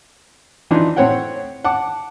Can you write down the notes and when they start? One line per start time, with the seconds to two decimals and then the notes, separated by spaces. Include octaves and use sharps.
0.71 E3 D4 D#4 F4
0.96 A2 C4 C#5 F#5 G5
1.64 F#5 A5 D6